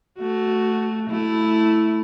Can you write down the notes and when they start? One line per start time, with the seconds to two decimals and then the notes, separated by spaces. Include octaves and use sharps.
0.19 A3 F#4
1.10 A3 E4